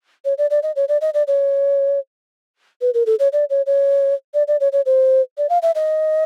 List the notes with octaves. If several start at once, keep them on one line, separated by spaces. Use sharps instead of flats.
C#5
D5
D5
D#5
C#5
D5
D#5
D5
C#5
B4
A#4
A4
C#5
D5
C#5
C#5
D5
D5
C#5
C#5
C5
D5
F5
E5
D#5